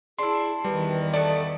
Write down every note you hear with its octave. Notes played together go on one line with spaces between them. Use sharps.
D4 E4 G#4 C6
E2 D#3 G3 B4
A3 B3 A4 D5